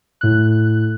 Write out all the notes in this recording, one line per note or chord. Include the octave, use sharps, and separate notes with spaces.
A2 F#6